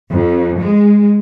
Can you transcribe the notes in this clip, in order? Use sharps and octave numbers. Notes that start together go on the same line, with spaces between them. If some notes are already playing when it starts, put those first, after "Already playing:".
F2
G#3